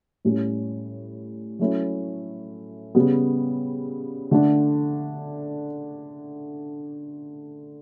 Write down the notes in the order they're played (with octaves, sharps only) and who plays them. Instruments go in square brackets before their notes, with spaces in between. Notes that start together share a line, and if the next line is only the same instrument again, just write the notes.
[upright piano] A2 G3 C#4
F#3 A3 C#4 E4
C#3 G3 B3
D3 A3 D4